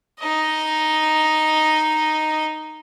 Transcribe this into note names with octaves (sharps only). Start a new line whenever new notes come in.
D#4 D#5